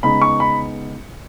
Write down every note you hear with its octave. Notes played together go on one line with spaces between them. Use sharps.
C#3 G#3 B3 D#4 B5
C#6
B5